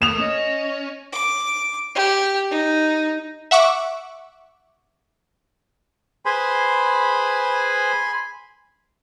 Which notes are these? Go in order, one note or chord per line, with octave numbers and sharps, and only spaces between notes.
A3 A#3 D#6 E7 F7
C#4 D#5
D6
G4
D#4
E5 F#5 C#6 D6
G#4 B4 C5 G#5 B5 C6